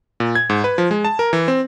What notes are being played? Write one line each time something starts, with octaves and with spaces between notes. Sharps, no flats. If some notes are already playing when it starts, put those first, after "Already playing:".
A#2
G#6
G#2
B4
F3
G#3
A5
A#4
E3
C4